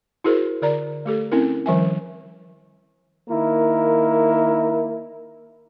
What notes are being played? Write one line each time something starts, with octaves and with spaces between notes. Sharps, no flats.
E4 F#4 G#4 A#4 C5
D3 A#4 D5 A#5
A3 G4 A4
C4 C#4 E4 A#4
D#3 F3 G3 E5 G#5
D#3 A#3 E4 A#4